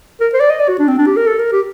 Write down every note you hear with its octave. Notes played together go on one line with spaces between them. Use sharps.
A#4
C5
D5
D#5
D5
F#4
D4
C4
D4
G4
A#4
A4
A#4
G4